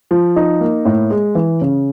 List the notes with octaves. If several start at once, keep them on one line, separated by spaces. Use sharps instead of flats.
F3
D#4
A#3
A2
G#3
E3
C#3